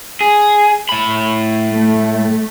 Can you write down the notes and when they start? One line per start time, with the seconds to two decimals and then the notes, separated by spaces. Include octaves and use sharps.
0.21 G#4
0.89 A2 B5
1.69 A3